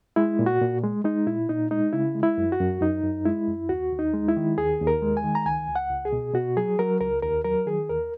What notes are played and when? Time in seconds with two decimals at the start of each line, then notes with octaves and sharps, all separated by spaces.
0.16 G#3 E4
0.39 A#2
0.46 F#4
0.61 A#2
0.84 G#3
1.04 G#3 D#4
1.27 A#2 E4
1.49 A#2 D#4
1.71 G#3 D#4
1.93 C#3 E4
2.15 G#3
2.23 E4
2.38 F#2
2.52 F#4
2.60 F#2
2.81 F#2 D#4
3.03 F#2
3.25 G#3 E4
3.48 F#2
3.69 D#2 F#4
3.92 D#2
3.99 D#4
4.14 G#3
4.28 E4
4.37 D#3
4.58 D#2 G#4
4.81 D#2
4.87 A#4
5.02 G#3
5.17 G#5
5.24 D#3
5.35 A#5
5.46 C#2 G#5
5.68 C#2
5.76 F#5
5.91 C#2
6.05 G#4
6.13 B2
6.34 B2 F#4
6.57 F#3 G#4
6.79 F#3 A#4
7.01 C#2 A#4
7.22 D#2 A#4
7.45 F#3 A#4
7.66 D#3 G#4
7.89 D#2 A#4